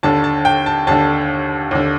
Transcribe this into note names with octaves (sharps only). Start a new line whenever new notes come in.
D#2 D3 A5
A5
G5
A5
D#2 D3 A5
D#2 D3